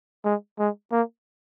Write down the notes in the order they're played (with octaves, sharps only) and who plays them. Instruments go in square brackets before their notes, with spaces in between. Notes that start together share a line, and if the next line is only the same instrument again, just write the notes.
[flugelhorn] G#3
G#3
A#3